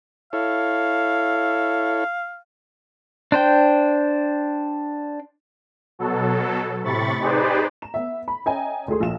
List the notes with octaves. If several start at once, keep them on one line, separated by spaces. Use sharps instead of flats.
E4 A4 C#5 F5
D4 C5 G5
B2 F#3 A4
A2 C3 B5 C#6 A6
D#4 G4 G#4 B4 C5 D5
A#5 E7
B3 E5
B5
C#4 D#5 E5 G5 G#5 A#5
D2 A3 G#4 C6
A#1 F4 E7